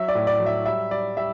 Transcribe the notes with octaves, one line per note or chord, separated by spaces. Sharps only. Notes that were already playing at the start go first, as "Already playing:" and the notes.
Already playing: F#3 E5
D5
A2
D5
F#3
E5
G3 E5
G3 D5
G3 E5